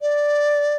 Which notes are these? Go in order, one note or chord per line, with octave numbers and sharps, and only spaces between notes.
D5